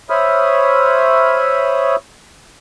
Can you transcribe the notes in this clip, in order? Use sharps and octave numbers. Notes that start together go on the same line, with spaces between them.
C5 C#5 E5 B5 D#6 F6